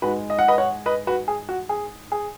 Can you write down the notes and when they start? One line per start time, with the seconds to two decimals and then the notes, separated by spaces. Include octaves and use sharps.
0.02 G#2 G#3 F#4 B4
0.30 D#5
0.39 F#5
0.48 B4 D#5
0.58 C#5 F#5
0.86 B4 D#5
1.07 F#4 B4
1.28 G#4
1.49 F#4
1.69 G#4
2.12 G#4